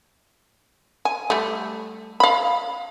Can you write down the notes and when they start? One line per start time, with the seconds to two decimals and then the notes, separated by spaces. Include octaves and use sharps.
1.05 G#5
1.30 G3 A3
2.20 F5 B5